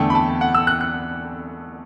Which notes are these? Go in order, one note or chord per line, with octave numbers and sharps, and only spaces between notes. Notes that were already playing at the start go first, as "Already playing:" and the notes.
Already playing: E2 D3 A3 G5
B5
A5
F#5
E6
F#6
F#6